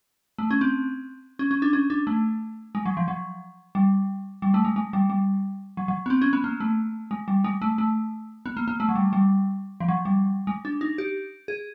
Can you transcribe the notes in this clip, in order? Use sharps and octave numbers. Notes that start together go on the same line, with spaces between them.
A3
C#4
C4
C#4
C#4
D4
C#4
D4
A3
G#3
F#3
F3
F#3
G3
G3
A3
G#3
G#3
G3
G3
F#3
F#3
B3
C4
C#4
B3
A#3
A3
G#3
G3
G#3
A3
A3
B3
A#3
A#3
A3
F#3
G3
G3
F3
F#3
G3
G#3
D4
D#4
G4
G#4